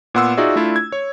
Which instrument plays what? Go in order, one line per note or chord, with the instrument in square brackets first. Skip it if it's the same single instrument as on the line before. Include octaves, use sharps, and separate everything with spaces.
[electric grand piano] A#2 B3 F#5 C6 E6
D#4 F4 F#4 G#4 D5 E5
A3 D4 E4 F4
G#6
C#5